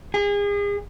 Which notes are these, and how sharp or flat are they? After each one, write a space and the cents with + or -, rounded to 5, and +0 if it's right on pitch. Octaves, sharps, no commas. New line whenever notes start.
G#4 -35